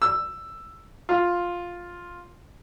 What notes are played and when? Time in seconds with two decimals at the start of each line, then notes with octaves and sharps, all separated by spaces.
0.02 E6
1.09 F4